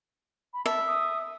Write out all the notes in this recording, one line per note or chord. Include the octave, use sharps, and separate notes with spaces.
B5
E5 A5
D#6